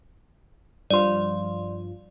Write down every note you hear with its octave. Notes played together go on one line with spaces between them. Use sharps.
G2 F3 F4 D5 C6